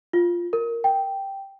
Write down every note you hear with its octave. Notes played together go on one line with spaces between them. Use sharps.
F4
A#4
G5